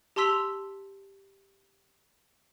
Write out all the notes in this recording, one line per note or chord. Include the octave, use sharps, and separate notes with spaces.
G4 A5 C6 E6 B6 F7